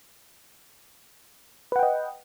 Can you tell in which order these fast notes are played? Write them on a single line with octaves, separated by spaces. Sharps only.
B4 F#5 G5 D#5